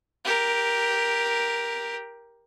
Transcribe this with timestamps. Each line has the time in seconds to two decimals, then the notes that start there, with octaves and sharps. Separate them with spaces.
0.25 G4 A#4